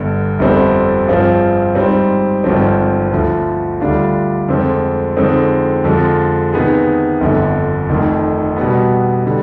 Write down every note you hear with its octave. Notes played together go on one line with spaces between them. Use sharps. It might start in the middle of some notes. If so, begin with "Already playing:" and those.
Already playing: G1 G2 D3
G1 F2 D3 G3 C4
G2 F3 C4 F4 G#4
G#2 G3 C4
G#1 G2 D3 F3 C4
D2 D3 F3
D2 D3 G3 D4 F4
F2 D3 G#3 C4
F2 D3 G#3 C4 D#4
F2 D3 F3 G#3
C3 D#3 B3 D#4 G#4
G1 F2 D3
F1 F2 D#3
B2 G3 B3
D3 G3